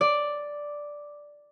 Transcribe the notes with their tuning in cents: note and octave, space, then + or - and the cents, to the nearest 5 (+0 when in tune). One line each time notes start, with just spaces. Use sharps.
D5 +0